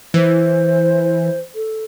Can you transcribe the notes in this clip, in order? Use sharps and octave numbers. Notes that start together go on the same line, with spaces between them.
E3 C5
A4